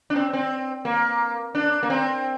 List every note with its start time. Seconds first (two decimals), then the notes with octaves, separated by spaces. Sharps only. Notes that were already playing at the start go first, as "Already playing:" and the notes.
0.10 D4
0.16 C4
0.33 C4
0.85 A#3
1.55 D4
1.83 A#3
1.90 C4